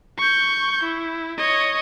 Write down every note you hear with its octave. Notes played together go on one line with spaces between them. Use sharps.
C#6 G6
E4
C#5 D#5